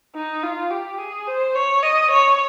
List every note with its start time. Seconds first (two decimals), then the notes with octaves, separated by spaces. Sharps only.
0.15 D#4
0.43 F4
0.70 G4
0.98 G#4
1.27 C5
1.55 C#5
1.83 D#5
2.11 C#5